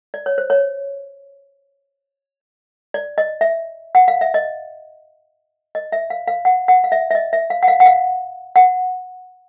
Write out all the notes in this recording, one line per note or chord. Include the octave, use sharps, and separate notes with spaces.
D5
C#5
C5
C#5
D5
D#5
E5
F#5
F5
E5
D#5
D#5
E5
F5
F5
F#5
F#5
F5
E5
E5
D#5
E5
F5
F#5
F5
F#5
F5
F#5